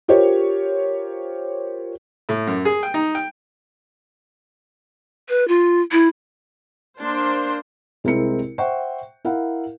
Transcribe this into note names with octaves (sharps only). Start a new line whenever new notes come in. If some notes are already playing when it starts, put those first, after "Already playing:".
F4 G4 A#4 C5 C#5
A2
F#2
G#4
G5
D#4
G5
B4
F4
E4
A#3 D4 C5 C6
C2 G#3 C4 E4 A#4 C#7
C5 E5 F#5 G5 C#6
E4 A#4 F5 F#5